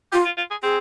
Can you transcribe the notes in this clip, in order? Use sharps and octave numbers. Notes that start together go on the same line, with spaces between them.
F4 G4
F4
F4
G#4
C4 G#4